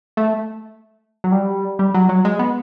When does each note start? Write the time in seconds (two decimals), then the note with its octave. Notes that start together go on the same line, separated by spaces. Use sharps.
0.17 A3
1.24 F#3
1.32 G3
1.79 G3
1.94 F#3
2.09 F#3
2.25 G#3
2.39 B3